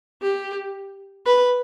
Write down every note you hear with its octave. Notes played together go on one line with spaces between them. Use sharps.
G4
B4